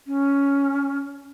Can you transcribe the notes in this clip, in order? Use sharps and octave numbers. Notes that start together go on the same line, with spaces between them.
C#4